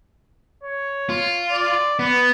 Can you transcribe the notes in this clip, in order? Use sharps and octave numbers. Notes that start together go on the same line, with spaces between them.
C#5
F4
D5
B3 B4